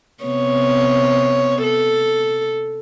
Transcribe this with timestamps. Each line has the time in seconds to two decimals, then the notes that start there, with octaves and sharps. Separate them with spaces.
0.24 C3 B3 C#5
1.63 A4